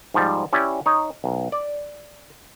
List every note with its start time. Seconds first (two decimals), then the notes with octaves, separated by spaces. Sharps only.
0.14 G#2 F3 G3
0.53 C#4 E4 G4 D5
0.86 D#4 C#5
1.24 B1
1.52 D5